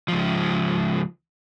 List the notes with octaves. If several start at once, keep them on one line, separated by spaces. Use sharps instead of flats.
C#2 F3